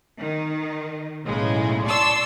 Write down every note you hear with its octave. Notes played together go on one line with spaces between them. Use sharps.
D#3
B1 A2 C#3 G#3
D5 A5 C6 C#6 E6